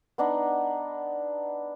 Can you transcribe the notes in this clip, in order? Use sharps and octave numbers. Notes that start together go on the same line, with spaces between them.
B3 D4 D#4